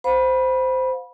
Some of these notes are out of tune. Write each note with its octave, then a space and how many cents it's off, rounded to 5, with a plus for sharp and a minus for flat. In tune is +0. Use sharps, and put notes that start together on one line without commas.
C5 -15 F5 +40 B5 -20